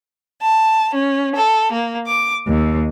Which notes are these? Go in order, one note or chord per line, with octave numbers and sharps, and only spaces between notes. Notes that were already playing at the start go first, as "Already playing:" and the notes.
A5
C#4
A4
A#3
D6
D#2